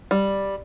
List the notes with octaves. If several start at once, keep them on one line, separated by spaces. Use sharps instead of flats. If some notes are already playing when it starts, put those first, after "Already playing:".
G3